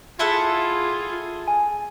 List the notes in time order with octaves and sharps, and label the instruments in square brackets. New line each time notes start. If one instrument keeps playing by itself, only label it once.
[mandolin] E4 A4 F#5 [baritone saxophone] F4 [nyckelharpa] G#4
[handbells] G#5